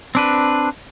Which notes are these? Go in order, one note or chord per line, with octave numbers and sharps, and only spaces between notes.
C4 D4 B4